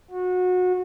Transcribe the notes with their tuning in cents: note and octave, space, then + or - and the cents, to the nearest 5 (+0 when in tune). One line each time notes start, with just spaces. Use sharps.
F#4 -25